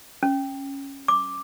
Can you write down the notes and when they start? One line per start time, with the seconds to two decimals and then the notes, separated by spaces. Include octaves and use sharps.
0.23 C#4
1.08 D6